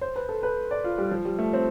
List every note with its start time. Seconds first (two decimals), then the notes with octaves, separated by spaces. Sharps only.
0.01 C5
0.16 B4
0.29 A4
0.43 B4
0.71 D5
0.84 F4
0.98 G3
1.11 F3
1.25 G3
1.38 A3
1.53 C4